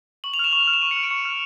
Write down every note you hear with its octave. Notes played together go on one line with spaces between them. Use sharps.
C#6 F#7
F7
F6 E7
C#6 F7
E7
F6
E7
C#6 D#7
C#7
F6
D7
C#6 C#7
F6